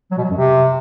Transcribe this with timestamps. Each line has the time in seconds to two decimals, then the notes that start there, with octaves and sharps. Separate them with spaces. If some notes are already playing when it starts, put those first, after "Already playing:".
0.11 F#3
0.18 B2
0.24 F#3
0.31 F#2
0.37 C3